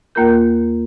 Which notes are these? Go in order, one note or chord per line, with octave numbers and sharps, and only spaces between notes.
D#2 A#3 F4 A#4 G6